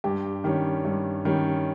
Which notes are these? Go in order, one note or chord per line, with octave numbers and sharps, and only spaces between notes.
G2 G4
D#3 G3 C#4
G2
D#3 G3 C#4